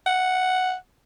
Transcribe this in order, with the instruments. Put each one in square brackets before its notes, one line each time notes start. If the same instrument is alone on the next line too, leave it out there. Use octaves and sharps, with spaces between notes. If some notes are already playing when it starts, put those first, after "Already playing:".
[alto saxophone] F#5